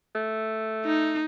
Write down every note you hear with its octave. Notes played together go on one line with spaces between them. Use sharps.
A3
D#4